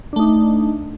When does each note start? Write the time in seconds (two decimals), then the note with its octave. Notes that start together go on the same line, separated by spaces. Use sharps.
0.13 D4
0.16 A3
0.19 D#4